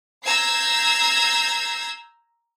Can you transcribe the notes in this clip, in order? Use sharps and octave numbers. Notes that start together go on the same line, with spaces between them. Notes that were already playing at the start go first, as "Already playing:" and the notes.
A#5 E6 G6 G#6 C7